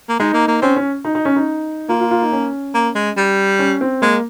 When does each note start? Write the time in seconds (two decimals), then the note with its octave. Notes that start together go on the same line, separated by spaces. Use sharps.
0.09 A#3
0.20 G#3 D#4
0.34 A#3
0.48 A#3
0.62 C4 C#4
0.76 C#4
1.05 D#4
1.15 D#4
1.25 C#4
1.36 D#4
1.89 A#3 F4
2.00 F4
2.11 F4
2.22 D#4
2.32 C#4
2.74 A#3
2.95 G#3
3.17 G3
3.59 C#4
3.81 C4
4.02 G#3 A#3